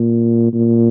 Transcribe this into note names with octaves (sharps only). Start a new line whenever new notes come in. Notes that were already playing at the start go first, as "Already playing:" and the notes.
Already playing: A#2
A#2